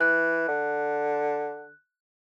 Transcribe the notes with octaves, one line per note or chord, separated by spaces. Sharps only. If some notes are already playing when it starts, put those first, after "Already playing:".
E3 F#6
D3